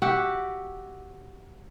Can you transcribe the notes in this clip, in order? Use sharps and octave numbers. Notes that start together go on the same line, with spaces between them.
F#4 G4 E5 F#5